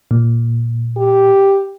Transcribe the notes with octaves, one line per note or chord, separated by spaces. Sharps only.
A#2
G4